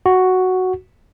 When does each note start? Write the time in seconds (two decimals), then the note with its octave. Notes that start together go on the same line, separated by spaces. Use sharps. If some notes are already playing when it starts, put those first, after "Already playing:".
0.06 F#4